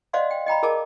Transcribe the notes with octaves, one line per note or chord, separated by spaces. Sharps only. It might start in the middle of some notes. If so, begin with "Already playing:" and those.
C5 D5 D#5 F5 F#5 C6
G5
D#5 G5 A#5 B5
G#4 A#4 D#5 A5 D6